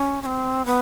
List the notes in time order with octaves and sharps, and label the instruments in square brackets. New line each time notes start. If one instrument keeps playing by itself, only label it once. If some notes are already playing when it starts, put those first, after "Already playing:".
Already playing: [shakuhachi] C#4
C#4
C4
B3